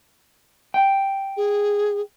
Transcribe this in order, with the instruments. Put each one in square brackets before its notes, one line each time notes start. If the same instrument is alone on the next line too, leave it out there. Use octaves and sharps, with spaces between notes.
[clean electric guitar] G5
[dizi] G#4